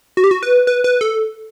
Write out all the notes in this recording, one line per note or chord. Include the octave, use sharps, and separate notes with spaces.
F#4
G4
F#4
B4
B4
B4
A4